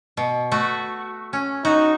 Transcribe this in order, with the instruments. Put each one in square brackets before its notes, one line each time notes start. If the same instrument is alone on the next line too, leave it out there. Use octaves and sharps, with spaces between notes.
[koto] B2
A3 F#4
C#4
[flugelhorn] D#4 [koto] F#4